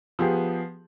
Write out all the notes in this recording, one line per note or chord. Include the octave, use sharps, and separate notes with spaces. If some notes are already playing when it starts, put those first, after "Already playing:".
F3 B3 G4 G#4